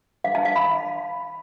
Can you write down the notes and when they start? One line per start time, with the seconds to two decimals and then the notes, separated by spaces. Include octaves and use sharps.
0.24 F5
0.35 A5
0.45 F5
0.56 B5